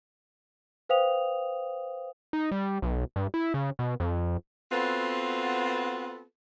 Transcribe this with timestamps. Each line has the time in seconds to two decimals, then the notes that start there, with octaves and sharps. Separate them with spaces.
0.89 B4 C5 F5 G5 D#6 F7
2.33 D#4
2.52 G3
2.82 B1
3.16 G2
3.34 E4
3.54 C#3
3.79 B2
4.00 F2
4.72 B3 C4 F4 F#4 A4 B4